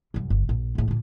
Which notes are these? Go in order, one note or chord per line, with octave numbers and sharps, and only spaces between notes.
C2 F#2
G1
A#1
E2 A2
A#2 D4